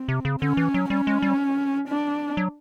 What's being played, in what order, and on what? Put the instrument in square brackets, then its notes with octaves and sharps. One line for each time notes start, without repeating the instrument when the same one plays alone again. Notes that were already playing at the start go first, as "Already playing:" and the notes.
Already playing: [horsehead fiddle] C4
[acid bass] C3
C#3
[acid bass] D3 [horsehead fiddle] C#4
[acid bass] E3
F#3
[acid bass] G3 [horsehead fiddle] C#4
[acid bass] G#3
G3
[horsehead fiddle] D4
[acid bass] F#3